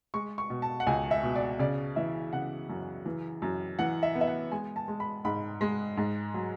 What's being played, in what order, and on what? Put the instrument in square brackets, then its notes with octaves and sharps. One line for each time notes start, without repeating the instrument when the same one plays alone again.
[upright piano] G#3 C#6
C#6
B2
A5
F#5
C#2 G#5
E5
B2
D5
C#3 D5
E3 E5
C#3 F#5
F#2
E3
F#2
E3 F#5
E5
B3
E5
F#5
G#3 G#5
A5
G#3
B5
G#2 B5
G#3
G#2
F#3